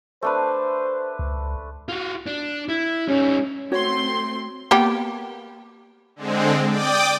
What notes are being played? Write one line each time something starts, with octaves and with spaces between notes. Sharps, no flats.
A3 D4 B4 C5
C#2
F4 F#4
D4
E4
G3 C#4 D#4
A3 C4 F#4 C#5 C6
A#3 B3 G4
D3 G#3 C4
D5 G5 D6 D#6